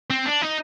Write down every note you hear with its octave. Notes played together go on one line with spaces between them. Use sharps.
C4
D4
D#4